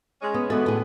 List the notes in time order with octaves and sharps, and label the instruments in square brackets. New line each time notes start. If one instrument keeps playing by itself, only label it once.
[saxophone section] G#3 C#4
[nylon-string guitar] B3 [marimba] D#6
[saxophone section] D3 E3 B3 [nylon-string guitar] G#3 F#4 [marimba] A4
[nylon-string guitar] A2 G#4